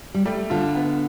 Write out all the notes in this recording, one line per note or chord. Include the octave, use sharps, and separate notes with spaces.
G3
G3 A3
D3 F4
B3